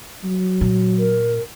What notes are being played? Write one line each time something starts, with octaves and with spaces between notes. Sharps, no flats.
F#3
A#2
A#4